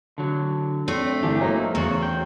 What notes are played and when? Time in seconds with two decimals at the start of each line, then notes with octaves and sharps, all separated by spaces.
0.18 D3 F#3
0.88 A3 C4 D4 C#5
1.23 G1 E3 D4 G4
1.41 F#3 A#3 D#4 C5
1.75 E2 C#3 F#4
2.02 G5